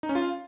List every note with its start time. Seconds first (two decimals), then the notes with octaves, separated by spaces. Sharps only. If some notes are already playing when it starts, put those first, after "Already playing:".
0.03 D#4
0.09 C#4
0.15 F4